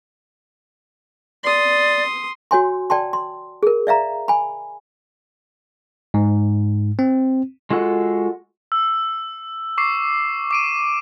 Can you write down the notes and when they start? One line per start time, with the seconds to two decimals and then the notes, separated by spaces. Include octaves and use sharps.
1.44 D5 C6 D#6
2.51 F#4 C#5 G#5 C6
2.90 D5 G5 A5 C6
3.13 C6
3.63 G#4 A#4
3.87 D5 E5 F5 A#5
4.28 G#5 B5
6.14 G#2
6.99 C4
7.71 G#3 F4 F#4 A4 F#5
8.72 E6
9.78 C#6 D6 C7
10.51 D6 D7 D#7